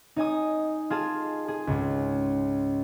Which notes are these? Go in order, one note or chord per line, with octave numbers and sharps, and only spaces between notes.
D#4 D#5 G#5 D#6
F4 G#4 A5
G#4
C#2 G#2